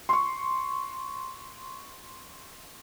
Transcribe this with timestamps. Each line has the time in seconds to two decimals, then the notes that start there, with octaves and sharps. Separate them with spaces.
0.09 C6 C#6